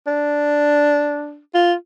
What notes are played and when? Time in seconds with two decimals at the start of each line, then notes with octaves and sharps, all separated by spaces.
0.07 D4
1.54 F4